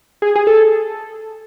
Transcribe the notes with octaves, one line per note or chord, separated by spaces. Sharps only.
G#4
G#4
A4